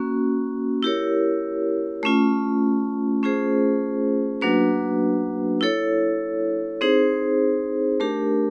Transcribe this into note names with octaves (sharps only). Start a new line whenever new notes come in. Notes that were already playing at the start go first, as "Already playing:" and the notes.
Already playing: A#3 C#4 F#4
E4 G4 A#4 C#5
A3 C#4 F4
A3 C#4 F4 G#4 C5
F#3 A#3 D4 F#4 B4
E4 A4 C#5
C4 D#4 G#4 C5
A3 D4 G4 A#4